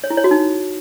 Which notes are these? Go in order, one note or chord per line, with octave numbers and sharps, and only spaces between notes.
C#5
E4
C#5
F#4
D#4